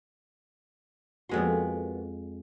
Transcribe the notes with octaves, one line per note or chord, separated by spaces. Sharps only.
F2 G#3 A#3 B3 F#4 C6